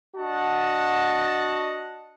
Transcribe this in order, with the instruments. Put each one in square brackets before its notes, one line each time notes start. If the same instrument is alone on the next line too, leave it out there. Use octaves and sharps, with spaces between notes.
[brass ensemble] D4 F#4 D#5 F#5 A5